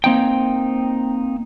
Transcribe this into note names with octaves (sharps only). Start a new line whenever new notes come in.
A#3 C4 D#4 G5